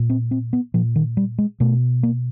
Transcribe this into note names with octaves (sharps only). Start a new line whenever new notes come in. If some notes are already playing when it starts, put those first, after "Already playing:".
Already playing: A#2
C4
C4
B3
A#2 F3
D#3
G3
G#3
B2 A3
A#3